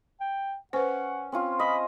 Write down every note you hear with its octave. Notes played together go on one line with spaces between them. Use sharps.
G5
C#4 B4 C5 F#5
C4 C#4 F4
D#5 B5